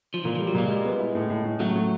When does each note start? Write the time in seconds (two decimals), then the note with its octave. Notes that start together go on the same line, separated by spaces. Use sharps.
0.14 F3
0.24 A#2 E3
0.35 F3 G3
0.47 F#3
0.55 A#2 G#3
0.70 G3
0.85 B3
1.00 E4
1.15 A2
1.30 A2
1.45 A2
1.60 F#3 A3
1.76 F#3